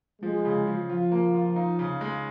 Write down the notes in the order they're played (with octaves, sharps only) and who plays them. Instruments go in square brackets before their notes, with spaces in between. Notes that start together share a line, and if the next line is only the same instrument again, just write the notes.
[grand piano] F3 [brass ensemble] G#3
[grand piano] C#3
F3
[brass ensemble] F3 [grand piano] F4
[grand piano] A#3
F4
D#4
C#3
G#3